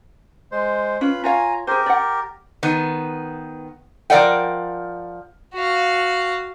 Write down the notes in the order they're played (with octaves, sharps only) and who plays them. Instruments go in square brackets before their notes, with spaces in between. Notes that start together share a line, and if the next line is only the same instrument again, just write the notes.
[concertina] G#3 C5
[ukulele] C#4 [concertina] F4 B4 B5
[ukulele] F4 C#5 F5 [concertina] G#5 A#5
[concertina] G4 A#4 [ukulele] G#4 C5
[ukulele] D5 F#5
[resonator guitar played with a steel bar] D#3 B3
F3 A#4 D5 F#5 G5
[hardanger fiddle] F#4 F5